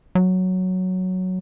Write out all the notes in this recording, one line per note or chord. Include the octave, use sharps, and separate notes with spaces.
F#3